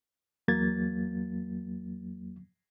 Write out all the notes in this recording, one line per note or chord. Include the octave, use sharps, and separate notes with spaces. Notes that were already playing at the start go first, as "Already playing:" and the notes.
E2 F#3 A#3 G#6 A6